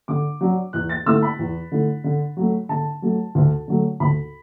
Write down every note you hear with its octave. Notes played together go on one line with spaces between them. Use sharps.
D3 D6
F#3 D4
E2 F#6
A6
D3 A3 E4 E6
B5
E2
D3 A3 E4
D3
F#3 A3
D3 A5
F#3 A3
D2
D3 F#3 A3
D2 B5